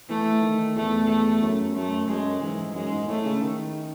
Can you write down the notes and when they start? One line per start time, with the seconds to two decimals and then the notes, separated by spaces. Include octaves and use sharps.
0.09 E3 A3
0.42 D#3
0.75 E2 A3
1.09 A3
1.42 F#2
1.75 F#2 A3
2.08 F#2 G#3
2.42 G#2 E3
2.75 F#2 G#3
2.92 G#2
3.08 A2 A3
3.25 C#3
3.41 D#3